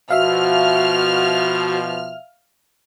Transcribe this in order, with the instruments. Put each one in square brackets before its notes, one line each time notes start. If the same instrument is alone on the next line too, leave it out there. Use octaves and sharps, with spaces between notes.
[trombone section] B2 F3 [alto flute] F#4 [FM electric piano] E5 F5 [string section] F6